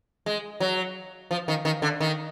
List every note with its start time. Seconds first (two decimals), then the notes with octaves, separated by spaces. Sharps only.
0.26 G#3
0.60 F#3
1.31 F3
1.48 D#3
1.65 D#3
1.82 D3
2.01 D#3